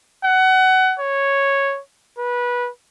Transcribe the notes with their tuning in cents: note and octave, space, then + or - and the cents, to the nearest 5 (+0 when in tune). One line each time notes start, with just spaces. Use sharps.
F#5 +25
C#5 -5
B4 -20